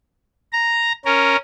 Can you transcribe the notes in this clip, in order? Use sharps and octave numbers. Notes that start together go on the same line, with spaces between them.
A#5
C#4 A#4